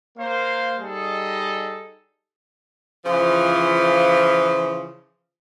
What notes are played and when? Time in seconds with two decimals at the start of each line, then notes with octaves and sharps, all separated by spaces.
0.18 A#3 C5 F5
0.80 G3 D#4 G#4 A4 D#5
3.05 C#3 E3 F3